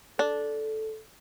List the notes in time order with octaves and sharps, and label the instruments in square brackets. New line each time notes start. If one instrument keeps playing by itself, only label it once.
[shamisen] D4 [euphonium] A4